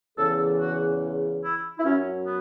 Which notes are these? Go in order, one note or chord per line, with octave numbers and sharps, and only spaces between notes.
E2 C#3 E3 A4
F#4
E4
E4
F#2 F#3 C#4
B3